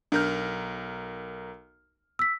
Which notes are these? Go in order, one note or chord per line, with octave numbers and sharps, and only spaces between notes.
B1 D4 A#4 F6 G6
E6 B6